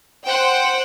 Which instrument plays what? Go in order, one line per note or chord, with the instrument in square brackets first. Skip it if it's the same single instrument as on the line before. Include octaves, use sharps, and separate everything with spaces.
[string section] C5 F#5 G5